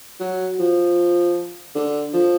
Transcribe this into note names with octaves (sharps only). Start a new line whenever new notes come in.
F#3
F3
D3
F3